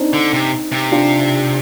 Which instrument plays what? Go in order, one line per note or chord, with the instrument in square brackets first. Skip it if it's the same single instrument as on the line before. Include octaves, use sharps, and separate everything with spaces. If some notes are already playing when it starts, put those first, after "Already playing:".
Already playing: [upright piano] C4 D4 D#4
[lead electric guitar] D3
C3
C3
[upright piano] D4 F4